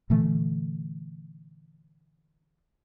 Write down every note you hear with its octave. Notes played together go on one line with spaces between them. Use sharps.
A#2 D3 E3 A3